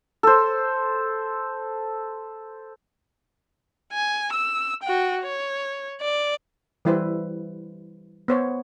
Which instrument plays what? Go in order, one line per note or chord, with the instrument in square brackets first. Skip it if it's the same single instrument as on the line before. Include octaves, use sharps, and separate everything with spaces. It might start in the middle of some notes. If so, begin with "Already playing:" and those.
[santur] A4 C5
[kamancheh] G#5
E6
F#4 G5
C#5
D5
[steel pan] E3 G3 E4 B4 C5
B3 C5 C#5